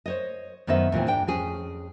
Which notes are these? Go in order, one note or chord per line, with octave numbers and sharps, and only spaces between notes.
C5 C#5 D#5
F#2 D#3 B3 C5 D#5 E5
D#2 A#2 E3 C4
G#2 D4 G5
F2 C#4 G#4